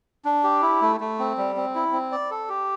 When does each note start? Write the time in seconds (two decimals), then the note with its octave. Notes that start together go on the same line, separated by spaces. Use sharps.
0.25 D4
0.44 G4
0.62 E4
0.82 A3
1.00 A3
1.19 C4
1.37 G3
1.56 C4
1.75 E4
1.92 C4
2.12 D5
2.31 A4
2.49 G4